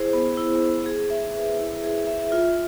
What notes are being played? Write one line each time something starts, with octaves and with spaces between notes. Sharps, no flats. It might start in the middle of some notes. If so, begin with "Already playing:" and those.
Already playing: E4 G#4 C5
B3
E4
C5
G#4
E5
B4
E4
G#4
E5
F4